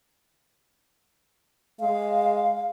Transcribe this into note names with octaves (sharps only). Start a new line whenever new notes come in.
G#3 F5